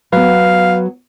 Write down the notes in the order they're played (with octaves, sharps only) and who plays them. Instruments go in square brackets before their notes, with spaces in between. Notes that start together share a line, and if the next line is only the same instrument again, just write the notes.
[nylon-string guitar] F#3 B3 [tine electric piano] B4 [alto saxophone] F5